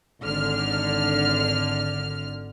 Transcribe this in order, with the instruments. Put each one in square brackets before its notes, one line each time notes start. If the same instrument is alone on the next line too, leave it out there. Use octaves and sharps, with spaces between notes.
[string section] G#1 D3 F6